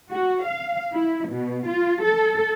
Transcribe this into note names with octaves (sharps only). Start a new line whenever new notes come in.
F#4
F5
E4
B2
F4
A4